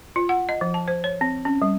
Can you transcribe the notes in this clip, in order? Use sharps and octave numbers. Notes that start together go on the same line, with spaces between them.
F4
F#5
D#5
F3
A5
C5
C#5
C4
C#4
G3